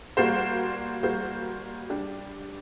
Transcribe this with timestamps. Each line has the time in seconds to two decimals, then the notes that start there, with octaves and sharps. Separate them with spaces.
0.17 G3 A#3 F#4 C5
1.03 G3 A#3 F#4 C5
1.90 G3 D4 G4